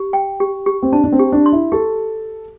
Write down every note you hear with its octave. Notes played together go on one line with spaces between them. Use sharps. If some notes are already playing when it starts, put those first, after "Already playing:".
Already playing: G4
G5
G4
G4
C4
D4 A5
D4
C4
G4
D4
C6
E4
G4 A4